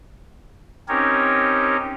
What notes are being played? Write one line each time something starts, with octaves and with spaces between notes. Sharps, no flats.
C4 C#4 D#4 G4 A#4 C#5